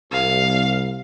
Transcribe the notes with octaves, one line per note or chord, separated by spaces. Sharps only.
C2 F5